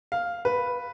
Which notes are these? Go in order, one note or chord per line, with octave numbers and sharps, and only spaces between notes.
F5
B4